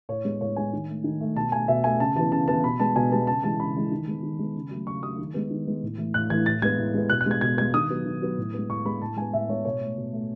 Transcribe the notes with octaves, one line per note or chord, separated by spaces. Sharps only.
A2 C#5
G#3 B3
A2 C#5
G#3 B3 G#5
D#3
A3
D#3
A3
B2 A5
A3 G#5
B2 E5
A3 G#5
C#3 A5
E3 B3 A5
C#3 A5
E3 B3 A5
B2 B5
G#3 B3 A5
B2 G#5
G#3 B3 A5
C#3 A5
E3 G#3 A5
C#3 B5
E3 G#3
D#3
G#3 B3
D#3
G#3 B3
C#3
F#3 A3
C#3 C#6
F#3 A3 D#6
D#3
G#3 B3
D#3
G#3 B3
A2
E3 A3
A2 F#6
E3 A3 G#6
A2 A6
G#3 B3 G#6
A2
G#3 B3
B2 F#6
F#6
G#3 B3 G#6
B2 G#6
G#3 B3 G#6
D#3 D#6
F#3 B3
D#3
F#3 B3
A2
G#3 B3
A2 C#6
G#3 B3 B5
A2 A5
G#3 B3 G#5
A2 E5
G#3 B3 C#5
B2 C#5
A3
B2
A3